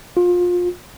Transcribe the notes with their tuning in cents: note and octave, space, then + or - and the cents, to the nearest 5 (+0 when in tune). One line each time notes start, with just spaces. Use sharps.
F4 +25